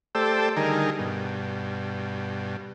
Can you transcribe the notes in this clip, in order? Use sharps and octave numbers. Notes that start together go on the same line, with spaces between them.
A3 G4 A4 C5 D5 E6
D3 D#3 G3 D#4 G#4 A#4
G2 B2